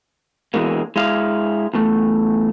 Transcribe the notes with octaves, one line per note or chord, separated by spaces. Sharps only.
B2 E3 G#3 A#3
G#3 E4 F5
E2 A3